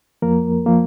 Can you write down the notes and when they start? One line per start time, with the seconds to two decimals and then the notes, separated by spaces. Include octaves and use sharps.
0.22 F2 F3 A#3 A#4
0.66 F3 A#3